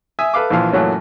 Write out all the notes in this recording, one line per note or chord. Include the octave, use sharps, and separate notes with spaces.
E5 G#5 D#6
A4 B4 F5 D6
A#1 A#2 E3 F3 F5
F#2 A#2 E3 F#3 A3 C#4